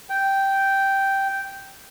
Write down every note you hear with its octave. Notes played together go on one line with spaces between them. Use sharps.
G5